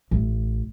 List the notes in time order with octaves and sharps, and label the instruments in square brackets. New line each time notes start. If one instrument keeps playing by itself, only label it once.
[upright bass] A1